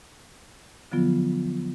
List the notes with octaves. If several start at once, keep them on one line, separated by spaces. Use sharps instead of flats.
D3 F3 F#3 B3 F4